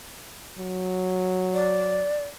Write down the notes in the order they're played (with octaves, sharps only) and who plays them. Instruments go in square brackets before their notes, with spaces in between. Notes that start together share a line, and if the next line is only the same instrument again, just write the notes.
[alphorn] F#3
[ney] D5